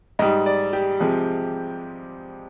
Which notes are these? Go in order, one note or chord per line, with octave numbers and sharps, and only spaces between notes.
G#2 G3 D#5
D5
G4
C3 F3 G#3